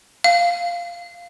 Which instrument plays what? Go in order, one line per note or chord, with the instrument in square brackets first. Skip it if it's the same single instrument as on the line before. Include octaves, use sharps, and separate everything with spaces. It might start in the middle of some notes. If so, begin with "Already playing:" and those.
[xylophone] F5